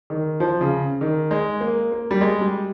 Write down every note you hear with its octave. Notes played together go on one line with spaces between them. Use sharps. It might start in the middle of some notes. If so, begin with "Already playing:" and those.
D#3
F3
C#3
D#3
G#3
A#3
A#3
G3
G#3
G3